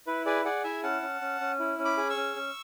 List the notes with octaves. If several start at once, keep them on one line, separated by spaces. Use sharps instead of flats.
E4 B4
G#4 B4 D5
G#4 D5 F#5
E4 E5 G#5
C#4 F#5 A5
C#4
C#4
C#4
E4
C#4
B5 D6
G#4
C#6 E6
C#4
C#4